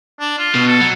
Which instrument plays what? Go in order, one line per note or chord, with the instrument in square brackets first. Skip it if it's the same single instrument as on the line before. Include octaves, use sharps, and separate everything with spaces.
[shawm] D4
F4
[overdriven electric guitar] B2
[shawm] A4
[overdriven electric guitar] F#3